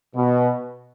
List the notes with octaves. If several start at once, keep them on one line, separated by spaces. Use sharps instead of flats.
B2